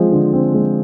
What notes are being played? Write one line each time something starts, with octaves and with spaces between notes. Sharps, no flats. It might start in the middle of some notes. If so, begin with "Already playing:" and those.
Already playing: F3 G#3 C4
D3
C4
G#3